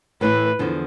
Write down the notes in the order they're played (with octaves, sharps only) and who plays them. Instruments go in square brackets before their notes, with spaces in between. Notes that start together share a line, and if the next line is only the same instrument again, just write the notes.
[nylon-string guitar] A2 E3 A3 E4 [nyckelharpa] B4
[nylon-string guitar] E2 D3 F3